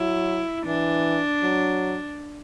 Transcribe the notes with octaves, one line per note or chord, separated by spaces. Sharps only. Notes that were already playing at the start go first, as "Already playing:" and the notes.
Already playing: F#3 E4
E3 D4
F#3